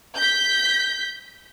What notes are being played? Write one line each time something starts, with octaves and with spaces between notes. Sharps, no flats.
G6 B6